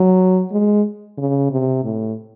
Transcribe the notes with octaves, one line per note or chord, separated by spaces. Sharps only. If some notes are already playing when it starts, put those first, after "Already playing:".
Already playing: F#3
G#3
C#3
C3
A2